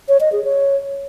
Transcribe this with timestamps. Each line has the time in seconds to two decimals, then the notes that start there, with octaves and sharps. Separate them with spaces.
0.09 C#5
0.21 D#5
0.32 G#4
0.44 C#5